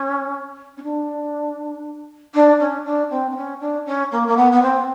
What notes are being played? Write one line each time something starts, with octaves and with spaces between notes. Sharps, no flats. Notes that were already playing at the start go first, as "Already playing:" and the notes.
Already playing: C#4
C#4
D4
D4
C#4
D4
C4
C4
C#4
D4
C#4
A#3
A#3
B3
B3
C4